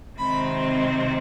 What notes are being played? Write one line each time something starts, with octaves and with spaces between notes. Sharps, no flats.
C3 D#3 G#3 C4 B5